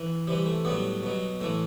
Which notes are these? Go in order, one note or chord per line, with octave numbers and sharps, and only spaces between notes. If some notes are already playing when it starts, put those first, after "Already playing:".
Already playing: E3
C3 E3 G3
A3
A2 F#3 G3 B3
B2 F#3
A2 E3 A3